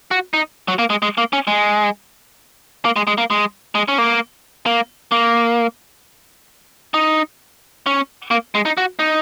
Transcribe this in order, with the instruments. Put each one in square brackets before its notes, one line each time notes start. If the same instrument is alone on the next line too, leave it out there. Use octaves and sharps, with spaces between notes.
[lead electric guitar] F#4
D#4
F#3
A#3
G#3
G#3
A#3
C#4
G#3
A#3
G#3
G#3
A#3
G#3
G#3
C#4
A#3
A#3
A#3
D#4
C#4
A#3
G#3
D#4
F#4
D#4